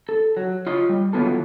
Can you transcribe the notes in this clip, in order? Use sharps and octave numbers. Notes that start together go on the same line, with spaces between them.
A4
F#3
F4 C#5 D#5
G3
D#3 E3 F#3 B3 F4 A4